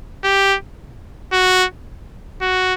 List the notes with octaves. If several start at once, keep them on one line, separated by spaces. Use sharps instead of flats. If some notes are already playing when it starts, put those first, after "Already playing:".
G4
F#4
F#4